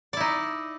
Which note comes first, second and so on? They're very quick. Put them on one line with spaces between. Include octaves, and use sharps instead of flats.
D5 E4 D#4